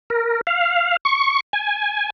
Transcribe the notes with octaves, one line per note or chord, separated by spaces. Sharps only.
A#4
F5
C#6
G#5